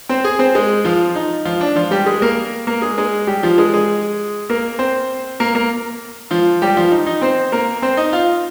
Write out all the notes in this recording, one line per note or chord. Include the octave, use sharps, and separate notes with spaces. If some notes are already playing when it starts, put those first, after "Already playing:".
C4 C5
G#4 G#5
C4 C5
G#3 G#4
F3 F4
D#4
F3 F4
D4
F3 F4
G3 G4
G#3 G#4
A#3 A#4
A#3 A#4
G#3 G#4
G#3 G#4
G3 G4
F3 F4
G#3 G#4
G#3 G#4
A#3 A#4
C4 C5
A#3 A#4
A#3 A#4
F3 F4
G3 G4
F3 F4
D#4
D#4
C4 C5
A#3 A#4
C4 C5
D#4 D#5
F4 F5